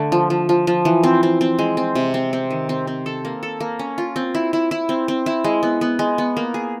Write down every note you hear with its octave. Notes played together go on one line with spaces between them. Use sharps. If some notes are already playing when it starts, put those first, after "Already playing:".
Already playing: D3 A3
F3
F3
F3
F3
E3
C4
C4
C4
G#3
C4
C3
C4
C4
D#3
C4
C4
A4
A#3
A4
A#3
C#4
F4
C4
E4
E4
E4
C4
C4
E4
G#3
B3
B3
G#3
B3
A#3
G#4